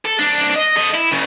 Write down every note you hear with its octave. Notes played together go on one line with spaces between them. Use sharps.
A4
C2 D4
D#5
A4 D#5
E4
F#2 C#3